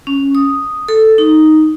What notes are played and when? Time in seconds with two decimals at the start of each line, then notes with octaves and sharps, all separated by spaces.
0.07 C#4
0.35 D#6
0.88 A4
1.18 D#4